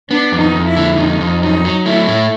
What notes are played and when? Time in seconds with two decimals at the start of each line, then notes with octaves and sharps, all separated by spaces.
0.10 B3 D4
0.32 F2
0.40 D#4
0.55 F2
0.69 E4
0.77 D3
0.99 F2 D#4
1.21 F2
1.42 F#3 D#4
1.65 F#3
1.86 A3 E4
2.08 A2